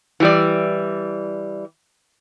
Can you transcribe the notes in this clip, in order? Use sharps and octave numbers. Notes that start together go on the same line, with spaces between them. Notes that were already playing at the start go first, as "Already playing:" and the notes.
E3 G3 D5